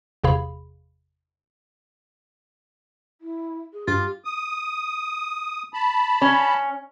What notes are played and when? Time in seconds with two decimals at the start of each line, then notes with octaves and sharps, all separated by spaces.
0.24 G1 E2 C3 G#4 F5 B5
3.21 E4
3.73 G#4
3.88 G2 F4 G4
4.25 D#6
5.73 A5 B5
6.22 C#4